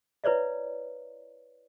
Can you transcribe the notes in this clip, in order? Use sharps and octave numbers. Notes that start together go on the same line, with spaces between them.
E4 B4 C#5 D5 E5